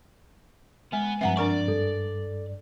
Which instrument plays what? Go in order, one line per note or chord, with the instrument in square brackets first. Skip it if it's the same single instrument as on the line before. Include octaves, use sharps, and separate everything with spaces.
[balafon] G#3 [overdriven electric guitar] B3 [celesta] G#5
[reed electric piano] G2 F3 C4 [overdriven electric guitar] B3 [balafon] E5 F#5 A#5
[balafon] D4 A#4 C#6 [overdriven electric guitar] D5
[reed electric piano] G2 [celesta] A4